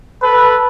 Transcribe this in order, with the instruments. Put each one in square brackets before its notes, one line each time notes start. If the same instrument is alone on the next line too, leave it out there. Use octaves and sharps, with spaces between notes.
[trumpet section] A4 B4